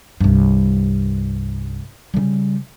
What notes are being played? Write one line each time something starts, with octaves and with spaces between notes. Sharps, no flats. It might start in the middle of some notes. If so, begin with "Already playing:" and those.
C2 G2
C#3 G3